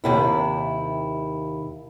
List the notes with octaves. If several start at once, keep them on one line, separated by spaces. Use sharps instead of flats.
D#2 C3 E4